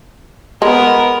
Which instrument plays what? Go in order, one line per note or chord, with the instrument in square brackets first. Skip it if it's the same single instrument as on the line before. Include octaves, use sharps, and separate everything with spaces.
[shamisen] G#3 [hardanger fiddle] B3 A#4